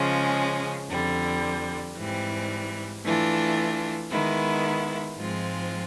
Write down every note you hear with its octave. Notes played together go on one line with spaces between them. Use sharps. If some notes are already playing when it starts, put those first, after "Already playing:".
Already playing: C#3 F3 G#3 C#4
F2 D3 G3
G#2 E3 G3 C4
E3 A3 D4 F4
D#3 G#3 B3 E4
G#2 F3 G#3 C4 F4